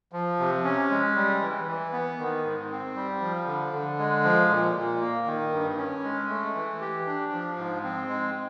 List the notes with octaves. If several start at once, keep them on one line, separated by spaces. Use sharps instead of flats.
F3
C3
C#4
G#3
G3
E3
E3
B3
D#3
G#2
C4
G3
F3
D3
D3
G#3
F3
A#2
A#2
A#3
D#3
G2
C#4
G#3
A3
E3
G4
D4
F3
G#2
C4
G#3